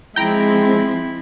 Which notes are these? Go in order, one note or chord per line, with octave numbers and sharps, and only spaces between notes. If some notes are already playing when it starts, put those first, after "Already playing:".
F3 G#3 C4 E4 G5 A#5